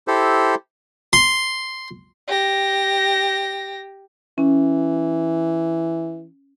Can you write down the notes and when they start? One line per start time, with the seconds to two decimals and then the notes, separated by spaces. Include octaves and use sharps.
0.08 E4 G4 A4 C5
1.13 C6
2.28 G4 A#6
4.38 E3 C#4